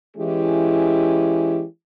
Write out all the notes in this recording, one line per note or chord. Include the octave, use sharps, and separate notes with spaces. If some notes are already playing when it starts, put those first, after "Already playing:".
E3 G#3 C#4 E4 G4